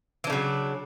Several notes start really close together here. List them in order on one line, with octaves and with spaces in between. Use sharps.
E3 D4 C#3 F#3